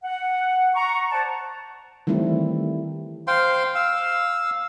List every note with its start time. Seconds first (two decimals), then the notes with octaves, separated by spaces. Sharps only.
0.04 F#5
0.74 A#5 C#6
1.11 C5 D5 F#5 A5
2.07 D#3 E3 G3 A3 C4 E4
3.27 C5 F5 G5 C6
3.75 F5 E6